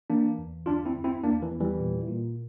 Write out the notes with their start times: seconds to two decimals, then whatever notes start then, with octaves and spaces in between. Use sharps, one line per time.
0.10 E3 A#3 D4
0.38 E2
0.66 G1 D4 F4
0.85 C4 E4
0.95 G1
1.04 C4 E4
1.23 E2 A#3 D4
1.42 E3
1.51 E2
1.60 E3 G3
1.79 A#2
2.08 A#2